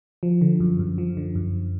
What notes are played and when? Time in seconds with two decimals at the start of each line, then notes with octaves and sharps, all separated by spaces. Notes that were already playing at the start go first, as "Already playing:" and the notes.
0.23 F3
0.41 D3
0.60 F#2
0.79 F#2
0.98 F3
1.17 D3
1.35 F#2